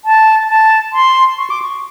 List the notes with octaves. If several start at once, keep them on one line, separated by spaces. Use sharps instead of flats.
A5
A5
C6
C#6
D6
C#6